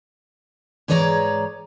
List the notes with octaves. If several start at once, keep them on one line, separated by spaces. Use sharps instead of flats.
G#2 E3 G#4 C#5 D5 A#5